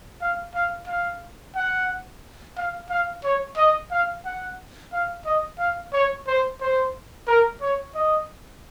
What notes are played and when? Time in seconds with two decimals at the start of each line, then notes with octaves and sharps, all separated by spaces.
0.21 F5
0.55 F5
0.88 F5
1.56 F#5
2.57 F5
2.90 F5
3.24 C#5
3.57 D#5
3.91 F5
4.25 F#5
4.93 F5
5.26 D#5
5.59 F5
5.93 C#5
6.27 C5
6.61 C5
7.27 A#4
7.62 C#5
7.95 D#5